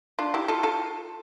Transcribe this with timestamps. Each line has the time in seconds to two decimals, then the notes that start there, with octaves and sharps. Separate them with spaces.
0.19 D4 F4
0.34 E4 G4
0.48 F4 A4
0.63 F4 A4